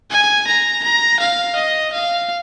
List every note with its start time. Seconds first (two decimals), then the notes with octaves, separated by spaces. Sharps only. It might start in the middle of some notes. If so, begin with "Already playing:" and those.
0.11 G#5
0.47 A#5
0.83 A#5
1.20 F5
1.56 D#5
1.93 F5